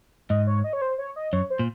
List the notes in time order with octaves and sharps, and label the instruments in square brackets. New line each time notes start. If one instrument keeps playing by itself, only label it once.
[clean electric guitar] G#2 [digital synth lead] D#5
[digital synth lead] C#5
D#5
C#5
C5
C#5
D#5
[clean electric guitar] F#2 [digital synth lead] C#5
[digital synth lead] C5
[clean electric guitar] A#2